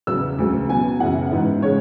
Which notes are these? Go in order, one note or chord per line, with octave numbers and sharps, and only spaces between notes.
E2 C#3 F#3 B3 E6
D2 C#3 F#3
B2 F#3 B3 G#5
F#2 C#3 E3 F#5
G#2 E3 B3
C#3 G#3 C#5